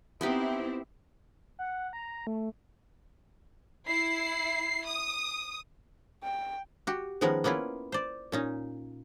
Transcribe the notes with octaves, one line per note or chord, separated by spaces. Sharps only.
B3 C4 D#4 E4 G4
F#5
A#5
A3
E4 C7
D#6
G5
F#4 G4
D#3 F3 G#3 B3 C#4 A#4
A#3 B3 C#4 E4 F4
C5 D5
A#2 C#4 D#4